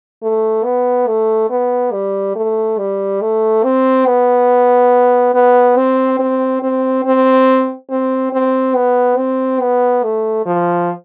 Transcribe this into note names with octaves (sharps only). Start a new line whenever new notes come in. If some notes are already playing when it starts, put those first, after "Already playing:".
A3
B3
A3
B3
G3
A3
G3
A3
C4
B3
B3
C4
C4
C4
C4
C4
C4
B3
C4
B3
A3
F3